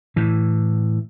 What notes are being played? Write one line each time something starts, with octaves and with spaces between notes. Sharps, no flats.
A2 E3